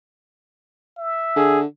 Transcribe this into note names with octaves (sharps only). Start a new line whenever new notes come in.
E5
D3 G#4